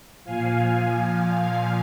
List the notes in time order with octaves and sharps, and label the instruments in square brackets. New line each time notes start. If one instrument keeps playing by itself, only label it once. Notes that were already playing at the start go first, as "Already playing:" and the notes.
[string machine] A#2 F3 F5 G#5